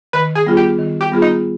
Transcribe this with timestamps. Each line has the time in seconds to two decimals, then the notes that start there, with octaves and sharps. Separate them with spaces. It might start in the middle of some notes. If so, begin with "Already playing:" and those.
0.13 D#3 B4
0.35 G#4
0.46 G3 B3 F4 G#4
0.57 G4
0.79 D#3
1.01 G4
1.12 G3 B3 F4 G#4
1.22 D#4